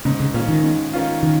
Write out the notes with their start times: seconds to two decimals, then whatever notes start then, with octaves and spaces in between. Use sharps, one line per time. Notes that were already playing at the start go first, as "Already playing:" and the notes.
0.05 G#2 C#3
0.20 C#3
0.34 A#2 D#3 C#4 F4
0.48 D#3
0.64 G#2
0.93 D#3 C#4 F4
1.23 D#3